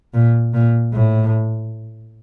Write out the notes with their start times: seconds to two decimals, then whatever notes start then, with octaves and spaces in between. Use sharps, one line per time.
0.14 A#2
0.54 A#2
0.93 A2